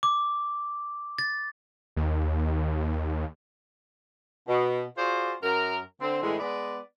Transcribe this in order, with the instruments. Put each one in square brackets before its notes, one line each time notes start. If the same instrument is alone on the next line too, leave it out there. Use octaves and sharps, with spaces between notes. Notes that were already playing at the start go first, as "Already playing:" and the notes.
[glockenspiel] D6
A6
[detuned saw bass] D#2
[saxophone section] B2
F4 F#4 G#4 C5 D5
F#2 A#4
D3 C4
A2 D3 E3 G#3
G#3 B3 B4 D5